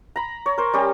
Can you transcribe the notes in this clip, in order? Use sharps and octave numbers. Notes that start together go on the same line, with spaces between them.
A#5 B5
C#5
A#4 C5
G3 C#4 G4